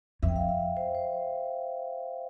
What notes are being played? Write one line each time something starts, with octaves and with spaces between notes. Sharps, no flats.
F2 E5
G5
F5
E5
C5
C5